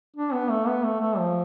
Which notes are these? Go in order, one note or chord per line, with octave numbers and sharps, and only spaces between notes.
D4
B3
A3
B3
A3
A3
F3